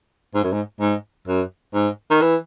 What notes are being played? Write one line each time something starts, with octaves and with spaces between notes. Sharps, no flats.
G#2
F#2
G#2
G#2
F#2
G#2
D#3
E3